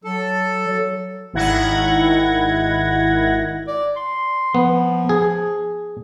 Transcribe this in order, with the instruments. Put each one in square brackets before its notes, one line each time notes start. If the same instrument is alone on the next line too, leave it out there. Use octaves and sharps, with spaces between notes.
[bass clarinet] F#3 [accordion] A4
[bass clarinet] F#3
[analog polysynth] G#1 D#3 E4 F#5 G#6 A#6
[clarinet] D5
C6
[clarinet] F3 [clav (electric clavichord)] B3
[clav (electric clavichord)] G#4